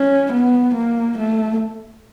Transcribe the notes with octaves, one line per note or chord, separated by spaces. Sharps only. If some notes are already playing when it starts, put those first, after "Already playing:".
Already playing: C#4
B3
A#3
A3